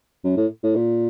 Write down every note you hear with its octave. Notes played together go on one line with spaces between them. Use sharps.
F#2
A2
A2
A#2